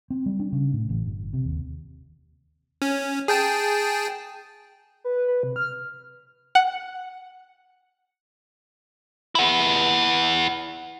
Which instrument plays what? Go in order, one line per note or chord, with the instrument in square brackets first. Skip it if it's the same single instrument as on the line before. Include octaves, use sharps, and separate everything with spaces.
[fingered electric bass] C4
G3
D4
C#3
A2
A1
G1
C3
D#2
[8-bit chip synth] C#4
G#4 G5 A5
[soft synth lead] B4
B4
C3
F6
[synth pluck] F#5
[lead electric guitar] E4 F#5